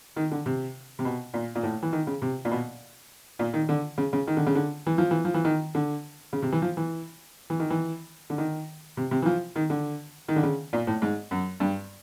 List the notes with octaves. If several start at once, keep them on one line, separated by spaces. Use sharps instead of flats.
D#3
D3
C3
C3
B2
A#2
A#2
A2
E3
D#3
C#3
C3
A#2
B2
A#2
D#3
D3
C#3
C#3
D#3
D3
C#3
D3
E3
F3
E3
F3
E3
D#3
D3
C#3
C3
E3
F3
E3
E3
D#3
E3
D3
D#3
C3
C3
E3
F3
D#3
D3
D#3
D3
C#3
A#2
A2
G#2
F#2
G2